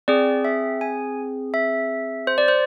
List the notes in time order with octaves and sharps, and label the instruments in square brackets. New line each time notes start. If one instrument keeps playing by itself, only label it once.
[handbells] C4 G#4 D5
E5
G#5
E5
C5
D5
C5